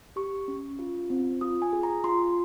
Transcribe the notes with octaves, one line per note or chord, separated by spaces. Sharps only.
G4 C#6
C#4
F4
C4
F4 D#6
G#5
G#4
A#5
F4 C6